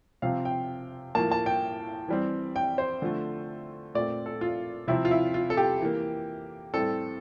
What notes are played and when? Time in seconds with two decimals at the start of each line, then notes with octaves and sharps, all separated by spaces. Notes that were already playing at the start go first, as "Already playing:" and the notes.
0.22 C3 F3 C4 F5
0.45 G5
1.15 A2 F3 A#3 A5
1.31 A5
1.46 G5
2.08 E3 G3 C4
2.56 G5
2.78 C5
3.02 D3 F3 A3
3.94 A#2 A3 C4 D5
4.26 A4
4.41 F4
4.88 C3 F3 C4 E4
5.05 F4
5.11 E4
5.34 F4
5.50 A4
5.57 G4
5.81 E3 A#3
6.73 A2 G3 C4 A4